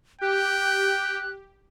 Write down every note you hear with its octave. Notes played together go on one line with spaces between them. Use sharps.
G4 G5 F#6